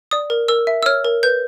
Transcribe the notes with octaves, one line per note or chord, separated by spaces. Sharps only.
D5 D#6
A#4
A#4 E6
E5
E6
C#5 F6
A#4
B4 G6